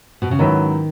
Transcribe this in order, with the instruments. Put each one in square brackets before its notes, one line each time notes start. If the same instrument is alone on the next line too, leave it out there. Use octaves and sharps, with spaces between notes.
[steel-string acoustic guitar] B2
C#3
[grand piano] G#2 F#3 C#4 E4 B4 [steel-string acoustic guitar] D#3